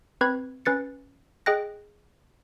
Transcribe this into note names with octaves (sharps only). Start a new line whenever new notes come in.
C4 B4 B5 G#6
C#4 B4 A6 C#7
G#4 D#5 G5 F#6 A#6